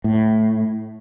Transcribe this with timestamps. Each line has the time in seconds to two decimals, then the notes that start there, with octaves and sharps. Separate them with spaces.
0.04 A2